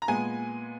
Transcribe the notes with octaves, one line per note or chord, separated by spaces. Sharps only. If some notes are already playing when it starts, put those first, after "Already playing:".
A#5
A#2 G#3 B3 G#5